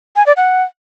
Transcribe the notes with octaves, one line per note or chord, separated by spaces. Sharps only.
G#5
D5
F#5